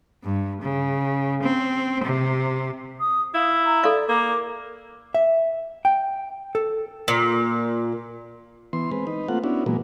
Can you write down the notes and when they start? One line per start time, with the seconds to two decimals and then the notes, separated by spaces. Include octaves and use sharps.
0.23 G2
0.61 C#3
1.42 C4
2.03 C3
3.00 D#6
3.34 E4 F5
3.65 A#5
3.84 A4 D5 F5
4.08 A#3 D6
5.14 E5
5.85 G5
6.55 A4
7.08 A#2
8.73 E3 B3 C6
8.91 G#3 C4 B4
9.07 D#4 B4
9.28 A3 A#3 C4 F4 F#5
9.44 B3 C#4 D4 E4 F#4
9.66 A#2 E3 F#3 G#3 A#3 B3